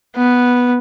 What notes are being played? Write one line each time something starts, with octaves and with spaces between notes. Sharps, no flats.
B3